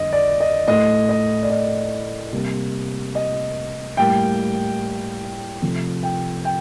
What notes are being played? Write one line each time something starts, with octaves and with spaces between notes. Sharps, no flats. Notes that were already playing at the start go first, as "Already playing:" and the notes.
Already playing: F2 D3 G3 A#3 D#5
D5
D#5
A2 A3 D#5
D#5
D5
D#5
C3 G3 A#3
D#5
A2 G3 A#3 G5
C3 F3 A3
G5
G5